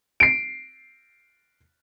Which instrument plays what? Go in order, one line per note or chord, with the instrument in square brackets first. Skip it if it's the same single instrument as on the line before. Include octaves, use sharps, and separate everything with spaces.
[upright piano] C7 D7